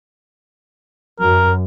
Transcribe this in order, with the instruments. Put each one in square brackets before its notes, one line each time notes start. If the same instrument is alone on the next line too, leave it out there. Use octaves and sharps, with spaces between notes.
[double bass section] F#2 [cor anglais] A#4